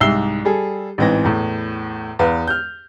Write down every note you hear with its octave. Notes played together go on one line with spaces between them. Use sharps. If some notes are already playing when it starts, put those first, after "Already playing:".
C2 G#2 E5 E6 C7 G7
G3 G#4 A4
A1 G#2 E3 C4 A#6
E2 A2
E2 B4 F5
F6 G6